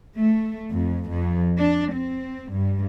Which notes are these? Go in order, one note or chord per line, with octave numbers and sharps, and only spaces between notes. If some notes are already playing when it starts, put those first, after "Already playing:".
A3
F2
F2
D4
C4
G2